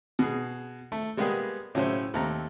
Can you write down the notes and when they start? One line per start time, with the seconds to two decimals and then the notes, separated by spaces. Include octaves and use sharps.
0.19 B2 G#4
0.92 A3
1.17 G3 G#3 A#3 B3 G4 G#4
1.75 A2 C#3 F#3 C#4 E4 C5
2.14 D#2 A3 C4 A#5